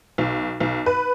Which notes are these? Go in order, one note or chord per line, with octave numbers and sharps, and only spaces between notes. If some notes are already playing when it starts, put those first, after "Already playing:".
B1
B1
B4